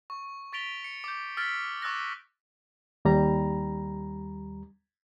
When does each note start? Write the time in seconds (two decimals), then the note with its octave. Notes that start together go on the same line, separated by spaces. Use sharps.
0.10 C#6
0.53 C#6 A6 B6 D7 F7 G7
0.84 C#7
1.04 D6 G6
1.37 E6 F6 A6 B6 D7
1.82 C#6 D6 E6 F#6 A6 A#6
3.05 D#2 G3 A#5